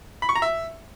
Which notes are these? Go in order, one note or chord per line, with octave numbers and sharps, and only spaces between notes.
B5
C#6
A#5
E5